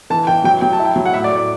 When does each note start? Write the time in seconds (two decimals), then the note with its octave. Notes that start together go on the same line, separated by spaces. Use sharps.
0.10 E3 A5
0.27 E3 G5
0.44 F#3 G5
0.61 F#3 G5
0.73 A5
0.80 E4
0.85 G5
0.96 F#3
1.06 F#5
1.13 A2 E5
1.24 D5
1.30 A2
1.36 D5